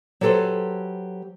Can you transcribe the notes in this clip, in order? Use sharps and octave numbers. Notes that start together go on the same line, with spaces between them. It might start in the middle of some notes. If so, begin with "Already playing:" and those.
F#3 G4 A4 B4 C5